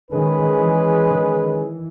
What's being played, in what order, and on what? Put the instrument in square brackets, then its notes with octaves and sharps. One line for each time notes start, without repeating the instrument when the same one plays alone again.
[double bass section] D#3 [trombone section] G#3 C#4 G#4 B4
[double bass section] E3
D#3
E3